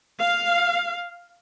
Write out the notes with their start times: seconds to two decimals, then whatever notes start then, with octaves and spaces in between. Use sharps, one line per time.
0.18 F5